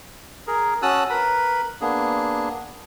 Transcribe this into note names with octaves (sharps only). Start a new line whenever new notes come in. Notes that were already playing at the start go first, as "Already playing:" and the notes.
G#4 A#4
C#4 F#4 A5 D#6 E6 F#6
A#4 B4 B5
A#3 B3 D4 G#4